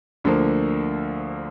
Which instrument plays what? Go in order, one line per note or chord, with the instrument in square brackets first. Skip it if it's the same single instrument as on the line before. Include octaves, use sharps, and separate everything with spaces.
[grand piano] D2 D3 F3 A#3